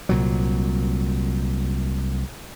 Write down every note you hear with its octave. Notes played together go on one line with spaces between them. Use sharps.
C2 A#2 F#3